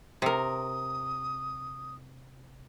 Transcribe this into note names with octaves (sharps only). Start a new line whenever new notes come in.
C3 A#4 D#6